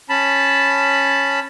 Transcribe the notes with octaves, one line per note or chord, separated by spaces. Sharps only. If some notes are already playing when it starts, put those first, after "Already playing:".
C#4 A5 B5